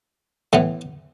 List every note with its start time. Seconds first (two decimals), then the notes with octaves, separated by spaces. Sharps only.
0.53 A2 E3 B3